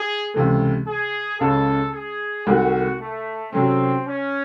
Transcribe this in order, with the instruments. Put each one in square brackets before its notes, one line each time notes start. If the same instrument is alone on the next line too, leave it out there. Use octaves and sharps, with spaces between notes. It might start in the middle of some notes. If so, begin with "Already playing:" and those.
Already playing: [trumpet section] G#4
[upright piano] C#2 C3 E3 A3
[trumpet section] G#4
[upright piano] C#2 C#3 G#3 C#4 [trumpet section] A4
[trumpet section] G#4
[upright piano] C2 C3 D#3 A3 [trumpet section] F#4
[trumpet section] A3
[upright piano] C3 F#3 A3 C#4 [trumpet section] C4
[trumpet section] C#4